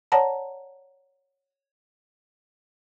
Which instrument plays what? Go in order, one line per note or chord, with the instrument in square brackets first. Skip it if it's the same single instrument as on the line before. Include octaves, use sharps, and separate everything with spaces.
[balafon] C#5 D5 F#5 A5 A#5